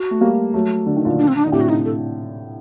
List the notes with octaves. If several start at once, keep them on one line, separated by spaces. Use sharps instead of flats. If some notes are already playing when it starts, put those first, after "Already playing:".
Already playing: F#4
A3
G3 A#3
F#3 A3
D3
D#3
A#2 D3
D4
C4
D4
D3 D#4
A2 C3 G4
F#4
D#4
A4